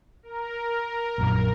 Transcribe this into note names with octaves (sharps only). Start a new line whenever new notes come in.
A#4
A#1 F#2